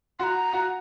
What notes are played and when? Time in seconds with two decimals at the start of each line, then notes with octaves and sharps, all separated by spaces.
0.19 F#4 A#5 C6
0.53 F#4